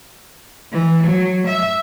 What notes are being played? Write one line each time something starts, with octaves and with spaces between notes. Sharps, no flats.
E3
F#3
E5